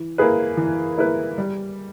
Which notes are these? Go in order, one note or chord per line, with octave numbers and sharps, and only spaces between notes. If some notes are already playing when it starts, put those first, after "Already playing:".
Already playing: E3
A#3 E4 G#4 B4
E3
A#3 E4 G#4 B4
G3